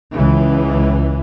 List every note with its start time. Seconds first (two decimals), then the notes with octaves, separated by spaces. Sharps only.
0.15 C#2 E3